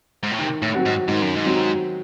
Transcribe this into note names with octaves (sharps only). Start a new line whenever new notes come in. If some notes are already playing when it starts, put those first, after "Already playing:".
G#2
A2
C3 D#3
A2
F#3 C4 F#4
G#2
G#2 D#3
F#2
G#2
F#3 C4 F#4